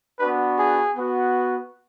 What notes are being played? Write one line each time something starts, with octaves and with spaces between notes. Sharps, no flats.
B3 D4 F#4 B4
G#4
B3 F#4